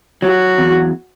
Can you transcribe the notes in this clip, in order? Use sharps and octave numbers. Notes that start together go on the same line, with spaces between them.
F#3 F#4
E2